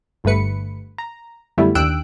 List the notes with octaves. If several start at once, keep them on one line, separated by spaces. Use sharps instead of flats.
G1 G2 D3 A3 B4 C#7
A#5
F#2 D3 G3 A3 B3 E4
D#2 D4 G5 E6 F#6 D7